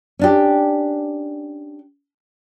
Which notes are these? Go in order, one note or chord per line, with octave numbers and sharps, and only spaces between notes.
C#4 D4 G4